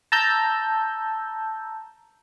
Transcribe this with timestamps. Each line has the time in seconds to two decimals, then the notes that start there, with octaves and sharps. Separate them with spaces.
0.12 A5 A#5 E6 G6